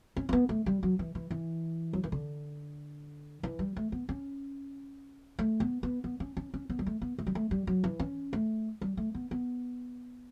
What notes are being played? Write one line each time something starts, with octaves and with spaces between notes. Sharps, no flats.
C#4
C#4
B3
A3
G3
F#3
E3
E3
E3
F#3
E3
D3
E3
G3
A3
B3
C#4
A3
B3
B3
B3
C#4
C#4
C#4
B3
G3
A3
B3
A3
G3
A3
G3
F#3
E3
C#4
A3
G3
A3
B3
B3